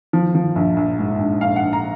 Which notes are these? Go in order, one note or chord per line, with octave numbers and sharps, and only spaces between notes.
F3
F3
A#1
A#1
G#2
A#1
A#1 F5
F#5
A#1
A#5